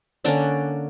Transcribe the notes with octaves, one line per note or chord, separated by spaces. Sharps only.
D3 A#3 C#4 D4 D5